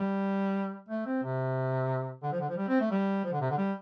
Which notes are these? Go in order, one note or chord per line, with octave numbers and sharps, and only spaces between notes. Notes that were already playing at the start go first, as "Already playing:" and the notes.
Already playing: G3
A3
C4
C3
D3
F3
D3
F3
G3
C4
A3
G3
F3
D3
C3
D3
G3